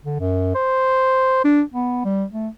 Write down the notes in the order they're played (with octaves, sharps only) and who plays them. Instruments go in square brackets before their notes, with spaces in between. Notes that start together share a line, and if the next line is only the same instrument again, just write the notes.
[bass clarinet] D3
F#2
C5
D4
B3
G3
A3